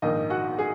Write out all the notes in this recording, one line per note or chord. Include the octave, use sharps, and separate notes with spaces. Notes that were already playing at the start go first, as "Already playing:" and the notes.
A#1 G#2 D#3 A#3 D#4 D#5
F#4 F#5
G#4